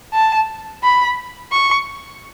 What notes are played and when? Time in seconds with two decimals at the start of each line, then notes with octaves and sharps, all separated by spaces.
0.14 A5
0.83 B5
1.52 C#6